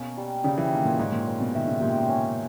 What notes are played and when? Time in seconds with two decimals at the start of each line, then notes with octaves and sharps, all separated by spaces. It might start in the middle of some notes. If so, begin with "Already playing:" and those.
Already playing: B2 A#3 C#4
0.17 G3
0.44 C#3 G3
0.58 E3
0.71 D#3 A#3
0.85 A#2
0.99 G#2 C#5
1.12 A#2
1.26 A#2 C#5
1.40 B2
1.54 D#3 E5
1.68 C#3
1.81 A#2 G4
2.08 C#4